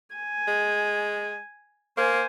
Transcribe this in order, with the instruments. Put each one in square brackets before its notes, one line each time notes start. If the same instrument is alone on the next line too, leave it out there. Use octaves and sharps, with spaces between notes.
[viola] G#5
[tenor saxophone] G#3
[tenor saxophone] A#3 [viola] C5 G#5